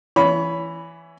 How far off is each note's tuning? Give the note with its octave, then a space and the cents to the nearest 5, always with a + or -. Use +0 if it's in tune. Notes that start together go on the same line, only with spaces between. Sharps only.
E3 +15 C#5 +30 B5 +0